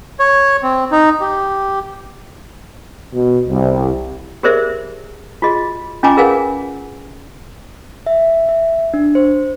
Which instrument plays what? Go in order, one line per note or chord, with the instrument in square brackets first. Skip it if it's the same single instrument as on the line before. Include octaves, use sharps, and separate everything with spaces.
[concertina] C#5
C4
D#4
G4
[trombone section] B2
C2
[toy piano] G4 G#4 A#4 C5 D5 E5
F4 F#4 G#4 D#5
C#4 F4 D#5 G#5 A#5 D6
G#4 A#4 B4 F5 F#5 G#5
[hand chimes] E5
E5
D4
C5